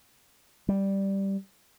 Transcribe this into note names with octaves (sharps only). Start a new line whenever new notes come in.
G3